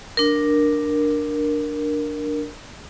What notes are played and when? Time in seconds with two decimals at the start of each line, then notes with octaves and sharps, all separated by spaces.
0.17 D4 A#4